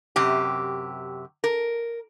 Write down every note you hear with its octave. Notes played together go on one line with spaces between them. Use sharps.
F#2 C3 G4
A#4